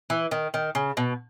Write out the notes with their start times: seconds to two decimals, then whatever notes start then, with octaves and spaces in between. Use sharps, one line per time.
0.10 E3
0.31 D#3
0.54 D#3
0.75 C#3
0.97 B2